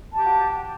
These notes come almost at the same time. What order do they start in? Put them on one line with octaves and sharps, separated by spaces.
A5 G4 G5 F#4